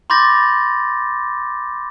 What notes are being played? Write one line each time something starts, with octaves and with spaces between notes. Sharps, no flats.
B5 C6 D6 G6 A6 A#6